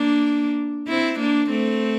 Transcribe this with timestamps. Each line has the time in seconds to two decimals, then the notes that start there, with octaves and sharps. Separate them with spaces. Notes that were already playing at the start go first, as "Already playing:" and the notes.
Already playing: A#3 D4
0.88 C4 E4
1.20 A#3 D4
1.50 A3 C4